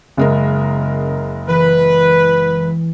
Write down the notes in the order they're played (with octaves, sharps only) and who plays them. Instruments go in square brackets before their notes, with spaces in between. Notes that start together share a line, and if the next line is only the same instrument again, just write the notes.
[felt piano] F#1 G#3 A#4 [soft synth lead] C#3
[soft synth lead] E3 [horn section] B4